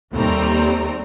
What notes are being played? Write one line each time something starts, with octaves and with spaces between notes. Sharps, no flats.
D#2 G3 A3 C4 A#5